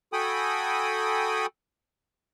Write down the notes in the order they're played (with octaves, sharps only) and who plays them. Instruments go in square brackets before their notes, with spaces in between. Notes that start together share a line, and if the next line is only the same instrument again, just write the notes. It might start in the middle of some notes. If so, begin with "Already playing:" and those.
[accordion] F#4 A4 G5 G#5 B5 D#6